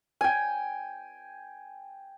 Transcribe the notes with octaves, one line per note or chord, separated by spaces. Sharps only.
G5 G#5